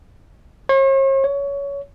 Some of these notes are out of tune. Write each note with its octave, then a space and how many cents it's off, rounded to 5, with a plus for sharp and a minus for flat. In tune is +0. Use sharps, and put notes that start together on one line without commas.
C#5 -45
C#5 +20